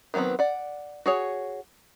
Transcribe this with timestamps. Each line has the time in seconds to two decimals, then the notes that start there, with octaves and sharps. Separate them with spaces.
0.14 D#3 F#3 B3 C4 B4
0.39 D5 F#5
1.06 F#4 G#4 C#5